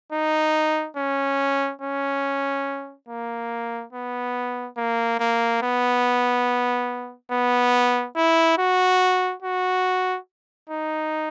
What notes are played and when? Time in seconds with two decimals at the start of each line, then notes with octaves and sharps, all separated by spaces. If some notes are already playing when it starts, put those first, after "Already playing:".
0.12 D#4
0.97 C#4
1.81 C#4
3.09 A#3
3.93 B3
4.77 A#3
5.20 A#3
5.62 B3
7.31 B3
8.16 E4
8.58 F#4
9.42 F#4
10.70 D#4